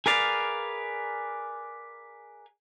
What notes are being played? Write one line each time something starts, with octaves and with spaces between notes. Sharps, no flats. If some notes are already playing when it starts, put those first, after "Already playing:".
G#4 A#4 B4 D5 F5